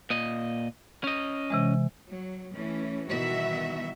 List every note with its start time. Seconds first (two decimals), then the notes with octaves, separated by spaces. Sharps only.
0.10 A#2 D#5
1.04 C#4 D#5
1.50 C3 E3 G#3
2.10 F#3
2.55 E3 A3 C#4
3.09 B2 D#3 E3 G3 F#4 E5